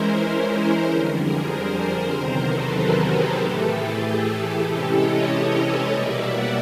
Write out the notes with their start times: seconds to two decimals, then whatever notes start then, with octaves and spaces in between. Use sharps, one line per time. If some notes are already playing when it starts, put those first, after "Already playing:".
Already playing: E3 G#3 C#4 E4 A#4 C5
0.88 F2 D3 G3
1.20 G#4 A#4
1.51 A#4 C5
2.13 E2 C3 D#3 F#3 A#4 C5
2.44 A4 B4
2.75 G#4 A#4
3.07 G4 A4
3.38 A2 E3 A3
3.69 G#4
4.00 G#4
4.31 G4 A4
4.63 C3 E3 G#3 C#4 E4
4.94 C#5 D#5
5.88 B2 G3 A#3 D5 E5
6.18 E5 F#5